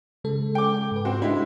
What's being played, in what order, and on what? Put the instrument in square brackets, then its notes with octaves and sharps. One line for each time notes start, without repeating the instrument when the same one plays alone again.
[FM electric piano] C#3 G#3 A4
[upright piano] G5 D6
[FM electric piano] G#2 B4
[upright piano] C4 F#4
[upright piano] G#3 E4 [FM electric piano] D4